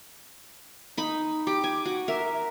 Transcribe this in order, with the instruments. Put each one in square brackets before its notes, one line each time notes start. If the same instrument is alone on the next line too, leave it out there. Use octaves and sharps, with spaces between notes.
[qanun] D#4 B5
[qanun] G4 [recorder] D6
[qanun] G#5
F#4
[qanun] A#4 [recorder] E5